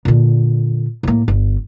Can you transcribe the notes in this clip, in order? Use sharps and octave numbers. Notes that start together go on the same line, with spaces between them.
A#2 D3
A2 A#3
G1